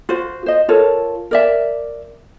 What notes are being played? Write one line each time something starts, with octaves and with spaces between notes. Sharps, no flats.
F4 F#4 C5
C5 D#5
F4 A4 A#4 C#5
A#4 D5 E5